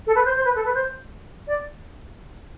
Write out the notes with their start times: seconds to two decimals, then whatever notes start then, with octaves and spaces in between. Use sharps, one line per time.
0.07 A4
0.15 B4
0.26 C5
0.36 C5
0.45 B4
0.55 A4
0.65 B4
0.75 C5
1.47 D5